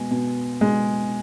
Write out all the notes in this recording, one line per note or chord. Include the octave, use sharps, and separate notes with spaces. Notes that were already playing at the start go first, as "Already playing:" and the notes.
Already playing: B2 G#3
B2
B2 G#3